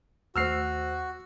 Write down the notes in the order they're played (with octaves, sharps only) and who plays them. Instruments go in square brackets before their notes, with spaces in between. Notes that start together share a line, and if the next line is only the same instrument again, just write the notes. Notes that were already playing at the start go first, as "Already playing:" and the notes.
[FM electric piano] D#2 A3 C5 [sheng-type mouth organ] F#4 [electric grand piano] E6 F6 C7